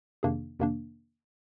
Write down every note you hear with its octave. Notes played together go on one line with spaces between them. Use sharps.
F2 C3 D#3 A#3 D4 G#4
F2 C3 D#3 A#3 D4